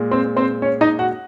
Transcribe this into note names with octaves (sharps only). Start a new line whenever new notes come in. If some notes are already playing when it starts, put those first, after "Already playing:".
Already playing: A#2 G#3
C4 C5
C4 C5
C#4 C#5
D#4 D#5
F#4 F#5